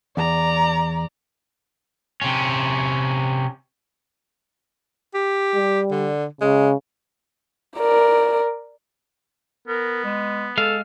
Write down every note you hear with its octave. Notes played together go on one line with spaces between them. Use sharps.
E2 D5 A#5
C3 C#4
G4
G3
D3
C#3 G#3
A#4 D5
B3 A#4
G#3
G#3 A4 F5